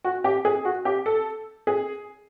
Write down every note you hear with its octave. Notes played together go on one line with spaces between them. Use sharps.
F#4
G4
G#4
F#4
G4
A4
G#4